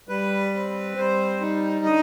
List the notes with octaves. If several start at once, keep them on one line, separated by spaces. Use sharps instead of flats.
G3 B4
C4
G3 C5
D#4
D3 D#5